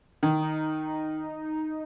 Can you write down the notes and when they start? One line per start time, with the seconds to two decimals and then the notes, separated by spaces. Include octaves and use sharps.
0.23 D#3
0.41 D#4